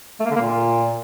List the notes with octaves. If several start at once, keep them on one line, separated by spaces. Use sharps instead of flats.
A3
A#3
D3
A#3
A#2